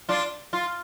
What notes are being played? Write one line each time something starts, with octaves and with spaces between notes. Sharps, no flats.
D4 F4
F4